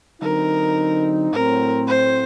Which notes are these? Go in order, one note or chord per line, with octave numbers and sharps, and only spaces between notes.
D3 F#3 C4 D#4 A#4
A2 F#3 C4 A#4
C5